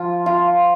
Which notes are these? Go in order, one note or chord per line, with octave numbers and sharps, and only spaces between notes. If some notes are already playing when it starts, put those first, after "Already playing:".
Already playing: F3 F4
F4